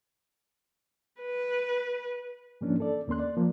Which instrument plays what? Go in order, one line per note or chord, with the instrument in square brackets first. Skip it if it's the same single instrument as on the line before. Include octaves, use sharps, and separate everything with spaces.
[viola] B4
[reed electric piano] G#2 E3 F3 A#3 C#4 D4
A4 D5
D#2 A#3 C#4 C6 F#6
D5
F3 A#3